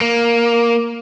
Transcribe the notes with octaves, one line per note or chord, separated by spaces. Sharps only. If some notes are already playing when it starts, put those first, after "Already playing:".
A#3